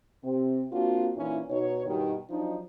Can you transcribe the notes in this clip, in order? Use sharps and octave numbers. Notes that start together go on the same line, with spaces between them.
C3 C4
A#3 C4 D4 F4 F#4
A#2 E3 C#4 D#4 E4
B2 D#4 C#5
G2 B2 D#3
F3 F#3 D4 D#4